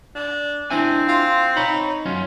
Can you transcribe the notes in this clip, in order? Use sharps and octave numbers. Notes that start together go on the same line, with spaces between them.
D4
C4 D4 E4 G#5
F4
D#4 C#5 B5
F#2 C#4 F4